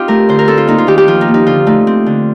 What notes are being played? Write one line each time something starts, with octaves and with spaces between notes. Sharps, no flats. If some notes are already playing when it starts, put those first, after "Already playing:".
Already playing: C4 D#4 F4 G4
A3 A#4
D3 C5
A#4
C4 A4
F4
A#3 D#4
F4
D#3 G4
G4
F3 F4
D#4
A#3
D#4
D3 F4
A3 D#4
C4
D3